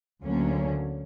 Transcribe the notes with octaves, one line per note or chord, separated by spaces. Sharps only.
D2 D3 F#3 A#3 C#4